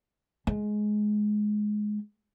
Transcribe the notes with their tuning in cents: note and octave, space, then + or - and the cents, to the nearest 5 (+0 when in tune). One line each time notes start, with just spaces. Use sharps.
G#3 +15